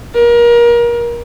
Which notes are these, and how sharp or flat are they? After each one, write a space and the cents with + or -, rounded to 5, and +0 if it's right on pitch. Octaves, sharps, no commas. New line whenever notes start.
A#4 +30